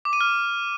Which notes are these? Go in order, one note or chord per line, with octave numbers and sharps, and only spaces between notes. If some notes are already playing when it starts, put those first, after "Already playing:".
D6
D#7
F6